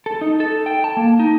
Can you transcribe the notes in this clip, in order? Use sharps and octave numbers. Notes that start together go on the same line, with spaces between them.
A4
D#4
A4
G5
A5
A#3
D#4